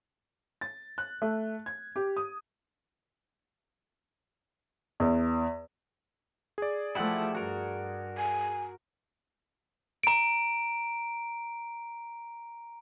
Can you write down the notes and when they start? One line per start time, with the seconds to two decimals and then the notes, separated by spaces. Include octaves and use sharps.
0.61 A6
0.98 F#6
1.22 A3
1.66 G#6
1.96 G4
2.17 D#6
5.00 E2
6.58 G#4 D5
6.95 F3 A3 E4 G4 F#5
7.35 G2 F#4 A#4
8.18 G#5
10.03 A#5 D7